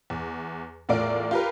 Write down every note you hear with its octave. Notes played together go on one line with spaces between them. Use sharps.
E2
E2 A2 F4 A#4 D5 D7
F4 G4 A#4 B4